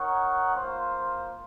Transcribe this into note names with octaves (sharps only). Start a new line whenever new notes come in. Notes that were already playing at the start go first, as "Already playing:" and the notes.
Already playing: D#4 A#4 C#5 F#5
A#3 F4 C5